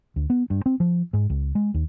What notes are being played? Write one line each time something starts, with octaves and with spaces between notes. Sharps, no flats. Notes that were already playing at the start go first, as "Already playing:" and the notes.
D2
B3
G2
C4
F3
G#2
C#2
G#3
D#2